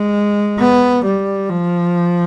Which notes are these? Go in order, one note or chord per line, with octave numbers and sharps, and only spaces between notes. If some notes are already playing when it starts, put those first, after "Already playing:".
Already playing: G#3
B3
G3
F3